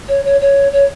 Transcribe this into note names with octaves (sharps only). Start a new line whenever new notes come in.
C#5
C#5
C#5
C#5